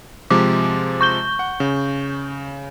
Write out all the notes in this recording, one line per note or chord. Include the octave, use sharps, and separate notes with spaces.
C3 F3 G#3 D6
C#6 G6 G7
F#5
C#3